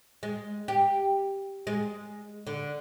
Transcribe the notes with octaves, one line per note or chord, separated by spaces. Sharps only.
G#3
G4
G#3
D3